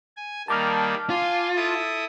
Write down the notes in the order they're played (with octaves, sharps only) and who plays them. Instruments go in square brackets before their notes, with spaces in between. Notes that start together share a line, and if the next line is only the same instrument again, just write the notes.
[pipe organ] G#5
[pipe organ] D#3 G3 A#3 [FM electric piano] A5 D6 F6
[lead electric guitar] F4 [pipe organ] G#5 C6
[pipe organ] E4 A4 D#6